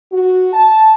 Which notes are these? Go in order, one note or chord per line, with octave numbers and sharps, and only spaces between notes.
F#4
A5